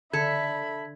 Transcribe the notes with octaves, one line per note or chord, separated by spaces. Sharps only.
D3 A4 E5 B5 G#6